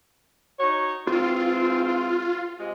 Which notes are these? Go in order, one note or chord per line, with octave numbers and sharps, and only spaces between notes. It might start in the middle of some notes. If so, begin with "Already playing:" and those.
D#4 F#4 C#5
G#2 E3 C4 F4
C3 G#3